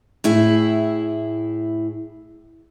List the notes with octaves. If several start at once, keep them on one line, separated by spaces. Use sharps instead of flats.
A2 E4 G#4